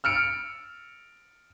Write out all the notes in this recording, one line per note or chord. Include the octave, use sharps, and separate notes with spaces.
E6 F6 C#7 D7